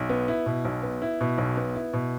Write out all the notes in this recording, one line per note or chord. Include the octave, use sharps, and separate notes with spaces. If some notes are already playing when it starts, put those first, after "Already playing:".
Already playing: B1
B3
E4
B2
B1
B3
E4
B2
B1
B3
E4
B2